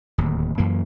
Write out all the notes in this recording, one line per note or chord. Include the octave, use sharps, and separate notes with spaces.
D1 D#2
F#2 E3 A#3